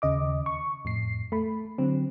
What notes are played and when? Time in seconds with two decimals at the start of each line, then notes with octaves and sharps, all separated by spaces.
0.02 D#2 C#3 D#5 D6
0.46 C#6
0.85 F2 A2 C7
1.32 A3 B5
1.78 D3 F#3 C4